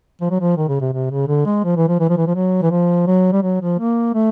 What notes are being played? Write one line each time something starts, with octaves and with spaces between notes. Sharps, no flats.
F3
F#3
F3
D#3
C#3
C3
C3
C#3
D3
G#3
F3
E3
F3
E3
F3
E3
F3
F#3
E3
F3
F#3
G3
F#3
F3
A#3
A3